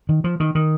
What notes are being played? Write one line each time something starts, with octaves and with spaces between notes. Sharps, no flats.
D#3
F3
D#3
D#3